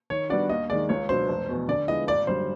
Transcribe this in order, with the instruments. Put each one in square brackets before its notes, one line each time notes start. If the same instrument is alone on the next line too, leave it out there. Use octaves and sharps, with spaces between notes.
[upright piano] D#3 [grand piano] C#5
[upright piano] G3 B3 D4 F#4 [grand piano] D5
[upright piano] D#2 [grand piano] D#5
[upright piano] D#3 G#3 [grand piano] D5
[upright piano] C#2 [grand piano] C#5
[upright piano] B2 F#3 B3 D4 [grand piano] C5
[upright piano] F1
E2 B2
[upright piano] D3 [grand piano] D5
[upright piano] F3 G#3 B3 E4 [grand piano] D#5
[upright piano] G#1 [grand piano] D5
[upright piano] F#2 D3 G3 [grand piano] C5